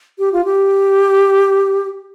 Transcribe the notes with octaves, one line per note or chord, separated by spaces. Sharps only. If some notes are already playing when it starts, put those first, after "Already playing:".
G4
F4
G4